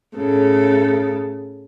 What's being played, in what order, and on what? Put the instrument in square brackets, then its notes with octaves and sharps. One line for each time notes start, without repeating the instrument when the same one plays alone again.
[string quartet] A2 C#3 A4